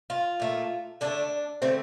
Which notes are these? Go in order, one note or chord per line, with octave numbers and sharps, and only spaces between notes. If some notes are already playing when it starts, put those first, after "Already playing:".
F4
A#2 A3
D3 A3 D4
D3 A3 C4